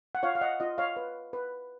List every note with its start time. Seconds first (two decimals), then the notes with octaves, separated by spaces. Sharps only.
0.15 F#5
0.23 F4 C#5 F5
0.35 F5
0.41 D#5 F#5
0.60 F4 D#5
0.78 C#5 F5
0.97 B4
1.33 B4